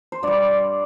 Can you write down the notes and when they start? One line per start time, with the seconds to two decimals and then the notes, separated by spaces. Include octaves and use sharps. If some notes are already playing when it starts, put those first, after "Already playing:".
0.12 C5
0.23 G2 G3 D5